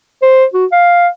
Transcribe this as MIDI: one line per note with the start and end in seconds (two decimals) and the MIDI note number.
0.22 0.45 72
0.54 0.66 66
0.72 1.08 77